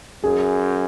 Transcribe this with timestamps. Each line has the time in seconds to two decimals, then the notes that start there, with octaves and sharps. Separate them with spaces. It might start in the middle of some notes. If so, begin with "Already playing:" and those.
0.24 F#2 G#4